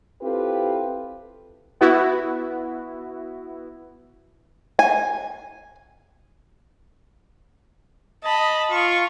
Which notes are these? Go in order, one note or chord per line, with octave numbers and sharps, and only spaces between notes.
C4 E4 F4 G4 A4 B4
B3 E4 F#4
G#5
D#5 A5 B5
F4 C#6